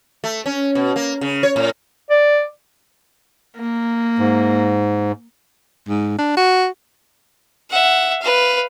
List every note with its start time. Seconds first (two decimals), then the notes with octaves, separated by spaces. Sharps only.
0.24 A3
0.46 C#4
0.75 B2
0.96 A#3
1.21 C#3
1.43 C#5
1.56 A2
2.10 D5
3.57 A#3
4.19 G#2
5.88 G#2
6.18 D4
6.37 F#4
7.70 E5 F#5
8.22 B4 F5